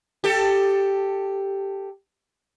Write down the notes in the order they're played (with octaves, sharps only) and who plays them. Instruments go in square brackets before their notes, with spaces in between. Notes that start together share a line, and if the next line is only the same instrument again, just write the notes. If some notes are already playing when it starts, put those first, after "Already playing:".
[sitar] G4 A4